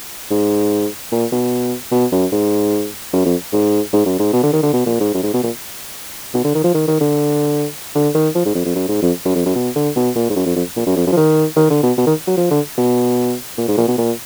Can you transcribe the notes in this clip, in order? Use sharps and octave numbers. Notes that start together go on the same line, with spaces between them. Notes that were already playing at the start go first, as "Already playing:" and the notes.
G#2
A#2
B2
B2
F#2
G#2
F#2
F2
G#2
G#2
F#2
G#2
B2
D3
D#3
D3
B2
A#2
G#2
F#2
G#2
B2
A#2
B2
D3
D#3
F3
D#3
D#3
D3
D3
D#3
F3
G#2
F2
F2
F#2
G#2
F2
F#2
F2
F#2
B2
D3
B2
A#2
G#2
F#2
F2
F2
A#2
F#2
F2
F#2
F3
D#3
D#3
D3
B2
B2
D#3
F#3
F3
D3
B2
A#2
G#2
A#2
B2
A#2